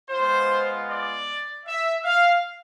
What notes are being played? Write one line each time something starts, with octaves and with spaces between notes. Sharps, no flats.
G#3 B3 F4 C5
D5
E5
F5